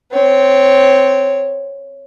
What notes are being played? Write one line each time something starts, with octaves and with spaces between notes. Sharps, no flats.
C4 C#5